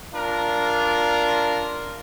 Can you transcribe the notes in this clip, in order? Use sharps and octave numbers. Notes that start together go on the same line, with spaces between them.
D4 F4 A#4